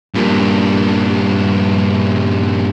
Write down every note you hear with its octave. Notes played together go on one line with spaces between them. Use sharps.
G2 A#2